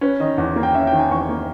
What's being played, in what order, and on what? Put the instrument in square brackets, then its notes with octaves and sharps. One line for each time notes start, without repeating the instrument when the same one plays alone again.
[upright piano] C#4 B4
D#3 D#5
E2
A#3
G5
C#4 E5
G5
D#3
G#5
E2 C#6
A#3